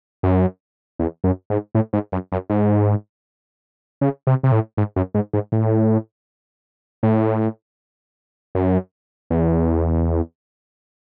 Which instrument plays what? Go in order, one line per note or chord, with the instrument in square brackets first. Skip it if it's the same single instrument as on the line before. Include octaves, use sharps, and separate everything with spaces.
[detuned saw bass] F#2
E2
F#2
G#2
A2
G#2
F#2
F#2
G#2
C#3
C3
C3
A2
G#2
F#2
G#2
G#2
A2
A2
F#2
E2